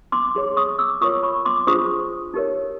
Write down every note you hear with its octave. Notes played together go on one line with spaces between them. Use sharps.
C6 D6
D#4 G#4 C#5
C#6 D#6
D6 E6
F4 A#4 C#5 C#6 D#6
B5 C#6
C6 D6
D4 F4 G#4 C5 C#6 D#6
D#4 G4 A#4 C#5